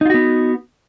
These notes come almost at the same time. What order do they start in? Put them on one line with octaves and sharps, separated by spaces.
D#4 F4 F#4 B3